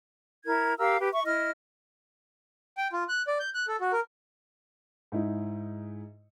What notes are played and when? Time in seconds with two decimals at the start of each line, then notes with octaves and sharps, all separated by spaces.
0.45 E4 A#4 G#6
0.78 G4 A#4 F5 E6
0.99 G4 B4
1.12 E5 C#6
1.24 E4 D#5 F6
2.77 G5
2.93 F4
3.09 F#6
3.28 D5
3.40 G6
3.55 F#6
3.68 A4
3.81 F#4
3.93 A#4
5.12 G#2 D#4 E4